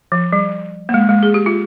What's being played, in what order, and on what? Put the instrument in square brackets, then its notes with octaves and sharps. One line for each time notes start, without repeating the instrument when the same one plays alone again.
[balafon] F3
G3
A#3
G#3
G#3
G#4
G4
F4